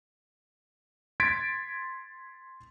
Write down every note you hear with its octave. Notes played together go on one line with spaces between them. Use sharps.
C6 G#6 A6 B6 D7